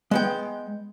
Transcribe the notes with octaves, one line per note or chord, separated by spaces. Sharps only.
G#3 B3 G5